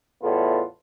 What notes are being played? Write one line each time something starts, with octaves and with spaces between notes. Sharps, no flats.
E2 A2 G3 B3 F4 A4